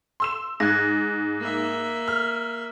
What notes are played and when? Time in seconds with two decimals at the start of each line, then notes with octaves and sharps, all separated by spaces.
0.20 C6 E6 E7
0.60 G#2 F#6 G#6 A#6
1.40 A#3 E5
2.08 F6